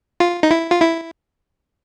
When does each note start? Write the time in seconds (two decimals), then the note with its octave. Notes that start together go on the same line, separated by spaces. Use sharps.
0.20 F4
0.43 D#4
0.51 E4
0.71 F4
0.81 E4